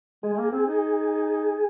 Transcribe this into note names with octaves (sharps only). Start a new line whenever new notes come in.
G#3 G#4
G#3
A#3
C4 G#4
D#4